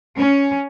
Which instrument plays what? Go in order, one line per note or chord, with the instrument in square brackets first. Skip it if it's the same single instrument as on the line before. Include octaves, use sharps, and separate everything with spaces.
[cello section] C#4